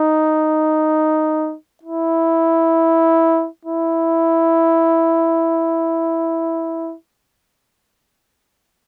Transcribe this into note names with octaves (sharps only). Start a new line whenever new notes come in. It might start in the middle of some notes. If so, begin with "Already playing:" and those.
Already playing: D#4
E4
E4